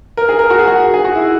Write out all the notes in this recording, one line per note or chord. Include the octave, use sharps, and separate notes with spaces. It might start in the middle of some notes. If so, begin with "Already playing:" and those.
A#4
G#4
A#4
F#4
G#4
F#4
G#4
F#4
E4